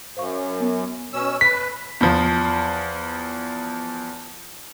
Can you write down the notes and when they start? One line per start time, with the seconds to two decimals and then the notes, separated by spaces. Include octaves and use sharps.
0.17 F#2 C5 F5 C#6
0.60 B3
1.13 B2 C#4 E6
1.41 B4 B6
2.01 E2 F3